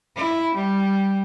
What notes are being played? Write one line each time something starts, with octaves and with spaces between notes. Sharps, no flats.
E4
G3